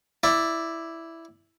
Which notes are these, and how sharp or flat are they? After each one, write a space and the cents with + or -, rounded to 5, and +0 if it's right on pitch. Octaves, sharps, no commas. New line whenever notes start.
E4 +0 D5 +0